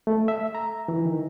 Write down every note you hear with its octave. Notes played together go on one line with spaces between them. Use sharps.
A3
E5
A#5
E3
D#3